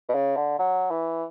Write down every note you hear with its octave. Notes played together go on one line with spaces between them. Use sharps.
B2
C#3
D3
F#3
E3